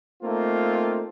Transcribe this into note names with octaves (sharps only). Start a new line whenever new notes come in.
A3 A#3 C4 D#4 F4